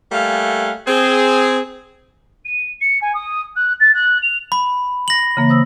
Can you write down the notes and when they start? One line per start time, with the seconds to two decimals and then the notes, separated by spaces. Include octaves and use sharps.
0.12 G3 A3 A#3 F5 F#5 G#5
0.88 C4 G#4
2.45 D#7
2.80 C#7
3.01 G#5
3.14 D#6
3.55 F#6
3.80 A6
3.93 F#6
4.22 F7
4.52 B5
5.08 A#6 F#7
5.37 C#3 E3 A#3
5.49 C5 D#6 E6